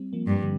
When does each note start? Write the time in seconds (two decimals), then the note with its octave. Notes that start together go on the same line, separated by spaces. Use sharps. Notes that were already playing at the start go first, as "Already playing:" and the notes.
Already playing: G3 C4
0.13 F3 A#3
0.27 G2
0.42 D3 G3